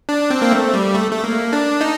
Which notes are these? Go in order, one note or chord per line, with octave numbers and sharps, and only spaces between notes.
D4
C4
A#3
A3
G3
A3
A3
A#3
D4
D#4